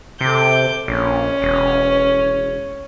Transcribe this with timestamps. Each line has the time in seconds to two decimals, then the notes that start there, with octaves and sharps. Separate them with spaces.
0.21 C3 A4 D6 G6
0.88 A#1 C#4
1.42 E1